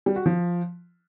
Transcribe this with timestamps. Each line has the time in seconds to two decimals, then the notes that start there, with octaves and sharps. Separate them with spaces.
0.06 G3
0.16 F#4
0.26 F3